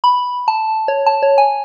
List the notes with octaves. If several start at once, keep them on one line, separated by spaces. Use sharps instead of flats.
B5
A5
C#5
A5
C#5
G#5